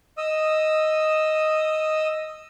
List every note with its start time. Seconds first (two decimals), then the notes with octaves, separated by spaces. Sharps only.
0.17 D#5 D#6 E6